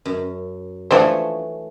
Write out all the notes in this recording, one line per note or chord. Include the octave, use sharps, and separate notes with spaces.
F#2
E3 F3 A3 D4 C5 C#5